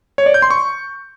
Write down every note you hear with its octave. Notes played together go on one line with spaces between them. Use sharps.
C#5
D5
G6
C6
C#6